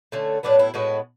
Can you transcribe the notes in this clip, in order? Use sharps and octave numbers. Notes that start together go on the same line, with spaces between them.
D3 A3 C#4
A2 F#3 B3 D4
E4
A2 G#3 B3 F#4